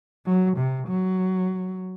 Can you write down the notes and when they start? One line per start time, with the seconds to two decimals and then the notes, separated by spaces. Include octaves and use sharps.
0.26 F#3
0.57 C3
0.88 F#3